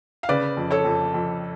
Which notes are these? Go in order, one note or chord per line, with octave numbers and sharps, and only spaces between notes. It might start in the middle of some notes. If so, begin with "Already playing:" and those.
F5
C#3 B4 D5
F2
A4 C#5
F2
F2